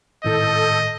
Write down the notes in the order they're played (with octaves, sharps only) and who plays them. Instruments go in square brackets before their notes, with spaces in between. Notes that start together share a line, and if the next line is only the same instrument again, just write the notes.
[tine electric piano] G#1 A2 [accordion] A4 G6 [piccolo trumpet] D#5